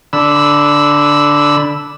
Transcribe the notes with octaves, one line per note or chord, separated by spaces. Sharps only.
D3 B5 E6